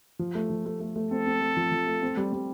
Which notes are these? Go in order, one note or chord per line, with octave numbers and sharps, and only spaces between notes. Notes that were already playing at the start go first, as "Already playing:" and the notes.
F3
A3
F3
A3
A3
A3
C4 A4
C4
A3
F3
F3
A3
C4
G3
G3